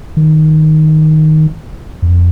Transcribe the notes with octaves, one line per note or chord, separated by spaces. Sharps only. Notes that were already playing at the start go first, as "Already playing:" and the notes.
D#3
F2